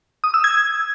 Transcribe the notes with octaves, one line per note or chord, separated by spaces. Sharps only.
D#6
E6
G#6